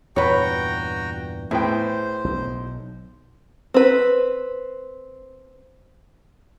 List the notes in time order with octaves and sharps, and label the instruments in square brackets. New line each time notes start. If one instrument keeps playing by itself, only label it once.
[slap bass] E2 G2 A#2 [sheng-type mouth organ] F#4 G5 A#5 [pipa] B4 C#5
[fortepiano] A2 B3 G5 [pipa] G#4 [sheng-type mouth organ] C5
[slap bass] B1
[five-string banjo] C4 B4